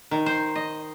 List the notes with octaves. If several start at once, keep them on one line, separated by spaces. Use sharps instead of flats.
D#3
C5
D#5